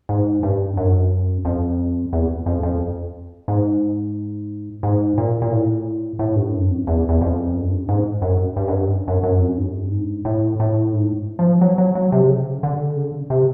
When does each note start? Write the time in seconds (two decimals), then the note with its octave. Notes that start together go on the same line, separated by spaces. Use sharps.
0.09 G#2
0.43 G2
0.77 F#2
1.45 F2
2.13 E2
2.46 F2
2.63 F2
3.48 G#2
4.83 G#2
5.18 A#2
5.42 A#2
5.52 A2
6.19 A2
6.36 G2
6.52 F#2
6.70 F2
6.87 E2
7.09 E2
7.21 F2
7.54 F#2
7.71 G2
7.89 G#2
8.22 F#2
8.56 G2
8.68 F#2
8.74 G2
9.08 F#2
9.23 F#2
9.41 F2
9.58 G2
9.91 G#2
10.25 A2
10.60 A2
10.93 G#2
11.39 F3
11.61 F#3
11.78 F#3
11.95 F#3
12.12 C3
12.28 C#3
12.63 D3
12.96 C#3
13.30 C3